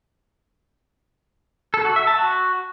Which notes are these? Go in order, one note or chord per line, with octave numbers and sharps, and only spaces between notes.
A4
F#4
E5
A5
F#4